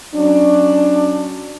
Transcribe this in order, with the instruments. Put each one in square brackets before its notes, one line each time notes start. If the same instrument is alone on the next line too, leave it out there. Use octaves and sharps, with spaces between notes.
[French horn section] F#3 C#4 D4